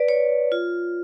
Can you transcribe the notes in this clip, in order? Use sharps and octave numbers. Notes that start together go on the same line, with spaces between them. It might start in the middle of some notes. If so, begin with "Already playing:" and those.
Already playing: B4 D5
C#5
F4